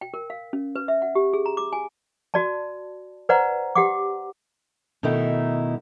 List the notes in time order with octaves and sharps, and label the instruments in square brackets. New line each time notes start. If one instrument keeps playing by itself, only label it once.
[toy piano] G5
A#4
F5
C#4
B4
E5
F#5
G4
G#4
A#5
D6
G#5
F#4 D5 A5
B4 C5 D5 F#5 A#5
G4 F#5 D6
[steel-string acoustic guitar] B2 D#3 A3 D#4 E4